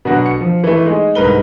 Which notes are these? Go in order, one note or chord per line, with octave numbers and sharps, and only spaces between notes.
B2 D3 F#3 D4 F#4
C#7
F3
E3 A3
G#3 D#4
C2 G#2 D3 A#4 B4 G7